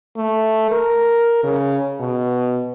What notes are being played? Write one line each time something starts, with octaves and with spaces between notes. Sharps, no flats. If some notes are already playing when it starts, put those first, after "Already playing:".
A3
A#4
C#3
B2